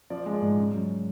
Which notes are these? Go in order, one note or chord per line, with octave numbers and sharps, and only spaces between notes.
F3 D5
G#3
D5
G#2
C#3
F#3